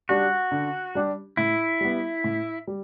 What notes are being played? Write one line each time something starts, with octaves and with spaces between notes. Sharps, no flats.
G3 D4 F#4 G4
D3
G3 D4 G4
A2 E4
G3 B3
A2
G3